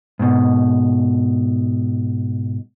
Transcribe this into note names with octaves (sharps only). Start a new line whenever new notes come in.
G#2 B2